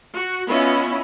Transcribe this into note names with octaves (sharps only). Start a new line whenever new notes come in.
F#4
B3 C#4 E4 F4 D#5 B5